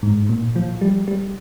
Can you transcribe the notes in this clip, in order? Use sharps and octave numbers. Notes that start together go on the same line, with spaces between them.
G#2
A#2
F3
G3
G3